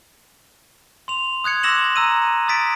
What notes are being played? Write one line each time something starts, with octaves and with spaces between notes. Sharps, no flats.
C6 F7
D#6 F#6 G#6 C#7
C6 D6 E6 A#6 E7 F#7
A#5 E6 D#7
D#6 A6 B6 D7